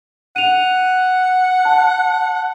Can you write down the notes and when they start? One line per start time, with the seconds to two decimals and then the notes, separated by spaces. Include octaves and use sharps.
0.36 F#5 D#7 F7
1.65 A5